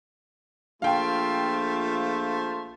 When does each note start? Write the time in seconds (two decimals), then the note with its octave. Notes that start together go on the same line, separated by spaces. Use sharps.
0.82 A#1 A3 F4 C5 F5 G5